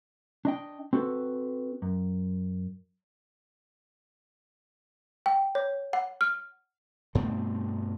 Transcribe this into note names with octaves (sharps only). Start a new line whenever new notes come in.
D4 D#5 G5
C4 F#4 A4 B4
F#2
G5
C#5
F#5
F6
G2 B2 A3 C4